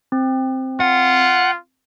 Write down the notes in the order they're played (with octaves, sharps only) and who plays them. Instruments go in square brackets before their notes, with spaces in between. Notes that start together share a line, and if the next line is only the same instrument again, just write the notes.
[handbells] C4
[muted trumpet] F4 [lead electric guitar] F#5